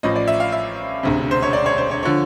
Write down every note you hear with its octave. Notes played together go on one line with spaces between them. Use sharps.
A1 A2 F3 D#5
D5
E5
F5
E5
E1 D2 C3
C5
C#5
D5
C#5
C5
C#5
D3 F3 C#5